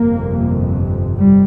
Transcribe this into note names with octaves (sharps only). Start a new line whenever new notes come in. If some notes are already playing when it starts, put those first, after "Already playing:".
Already playing: G1 F2 C3 A#3
G3